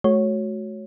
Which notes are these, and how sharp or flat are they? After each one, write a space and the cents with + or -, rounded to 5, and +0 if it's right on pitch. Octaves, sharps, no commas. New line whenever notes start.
A3 -40 F#4 +0 C#5 -5